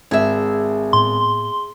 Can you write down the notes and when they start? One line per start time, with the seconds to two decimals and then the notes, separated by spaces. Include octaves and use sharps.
0.11 G#1 G#4 E5
0.93 A2 B3 C6